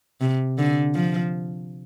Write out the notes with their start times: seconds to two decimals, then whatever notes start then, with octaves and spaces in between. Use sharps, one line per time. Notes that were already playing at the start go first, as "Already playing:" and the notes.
0.21 C3
0.58 D3
0.95 F3